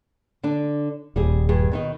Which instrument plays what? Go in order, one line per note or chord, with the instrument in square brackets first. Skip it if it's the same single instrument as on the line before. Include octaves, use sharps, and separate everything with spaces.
[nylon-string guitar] D3 D4
[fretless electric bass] D#1 [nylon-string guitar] G3 C4 G#4
[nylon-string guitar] G2 G3 G#4
B2 D#3 D#5